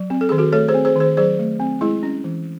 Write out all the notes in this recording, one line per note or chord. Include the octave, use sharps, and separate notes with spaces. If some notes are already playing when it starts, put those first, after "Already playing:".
Already playing: F#3
C4
A4
D#3 G#4
F#4 A4
A3 A4 C#5
G#4 C5
C4
G#4 C5
D#3 G#4 C5
F#3 G#4 C5
A3
C4
G#3 E4 G#4
C#4
E3